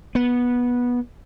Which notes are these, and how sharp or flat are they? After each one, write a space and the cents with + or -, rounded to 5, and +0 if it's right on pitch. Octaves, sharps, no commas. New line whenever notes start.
B3 -15